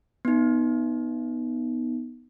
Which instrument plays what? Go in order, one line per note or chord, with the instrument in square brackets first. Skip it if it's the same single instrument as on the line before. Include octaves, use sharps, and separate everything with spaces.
[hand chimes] B3 D#4